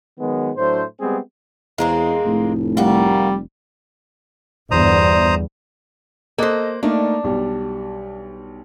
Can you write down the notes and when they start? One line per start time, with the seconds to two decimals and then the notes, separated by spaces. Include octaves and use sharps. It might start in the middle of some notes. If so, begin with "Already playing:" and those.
0.19 D#3 F#3 G#3 B3
0.57 A2 F#3 A3 D4 C5
1.00 G3 G#3 B3 C4 G4 G#4
1.78 E2 G#3 A#3 C4
2.25 F1 A2
2.77 G3 A#3 F#4
4.71 G1 E2 E4 C5 D5 A#5 D#6
6.38 A#3 A4 C5 D#5 F#6
6.83 A3 A#3 D4 D#4
7.24 B1 G3